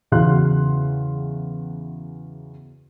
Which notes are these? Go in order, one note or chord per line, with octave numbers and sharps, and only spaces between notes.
E2 C#3 F#4 F5 C6 F#6